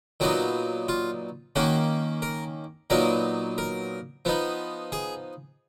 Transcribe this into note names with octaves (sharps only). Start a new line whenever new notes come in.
A#2 F#3 B3 D#4 F#4
F4
D#3 A#3 C#4 F#4
A#4
A#2 F#3 B3 D#4 A#4
A#4
F3 B3 D#4
G#4